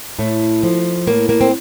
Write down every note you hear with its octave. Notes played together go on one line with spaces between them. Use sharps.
A2 A3
F3
A2 A#3
A#3
C4